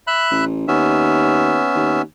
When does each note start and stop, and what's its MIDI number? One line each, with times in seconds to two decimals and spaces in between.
0.07 0.45 76
0.07 0.45 83
0.07 0.45 90
0.31 0.66 33
0.68 1.66 39
0.68 2.02 59
0.68 2.02 61
0.68 2.02 76
1.75 2.01 39